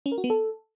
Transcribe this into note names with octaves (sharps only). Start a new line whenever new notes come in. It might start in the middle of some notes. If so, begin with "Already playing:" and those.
C#4
A#4
F#4
B3
A4